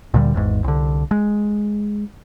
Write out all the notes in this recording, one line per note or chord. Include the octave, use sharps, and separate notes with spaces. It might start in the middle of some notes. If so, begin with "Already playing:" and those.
D2 A#2 D3 G3
G#1 E2 G#2
C2 D3
G#3